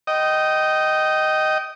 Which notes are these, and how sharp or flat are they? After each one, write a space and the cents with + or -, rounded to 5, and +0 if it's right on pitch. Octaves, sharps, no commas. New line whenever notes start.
D#5 +0 G5 -25